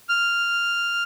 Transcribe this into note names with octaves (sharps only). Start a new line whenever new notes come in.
F6